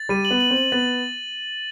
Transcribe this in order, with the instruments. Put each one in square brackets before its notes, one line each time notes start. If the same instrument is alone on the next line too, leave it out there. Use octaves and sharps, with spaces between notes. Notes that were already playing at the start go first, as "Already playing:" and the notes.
Already playing: [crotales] A6
[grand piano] G3 [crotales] D#7
[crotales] F#7
[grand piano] B3
[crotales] F#7
[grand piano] C4
[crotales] F#7
[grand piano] B3 [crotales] A6